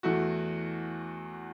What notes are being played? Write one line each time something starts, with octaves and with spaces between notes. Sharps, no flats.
E2 E3 A3 F#4